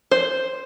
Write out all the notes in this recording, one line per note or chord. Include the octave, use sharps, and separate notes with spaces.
C5